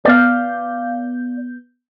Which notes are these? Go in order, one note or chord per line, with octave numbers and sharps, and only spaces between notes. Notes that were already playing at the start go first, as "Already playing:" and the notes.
B3 D5 F5 G6